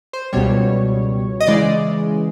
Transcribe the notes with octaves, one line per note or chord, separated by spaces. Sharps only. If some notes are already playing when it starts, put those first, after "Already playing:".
C5
C#2 B2 G3 C#5
D#5
C#3 E3 G#3 D5